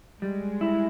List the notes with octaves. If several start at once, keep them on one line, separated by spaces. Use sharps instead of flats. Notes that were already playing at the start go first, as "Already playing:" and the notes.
G3 G#3
E4